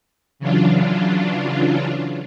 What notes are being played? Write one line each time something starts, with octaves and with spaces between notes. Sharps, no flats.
C#3 E3 F#3 D4 F4